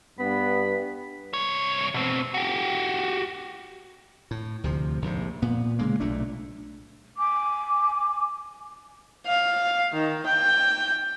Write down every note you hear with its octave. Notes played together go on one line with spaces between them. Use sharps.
G2 B3 B5
C2 C#5
B2 C4
F#4 G4
A2
D2 C3 F3
A#1 G#2 C3
A#2 B3
C#3 G#3 A#3
B1 A#2 A3 D4
G#5 D6
F5
D#3
G5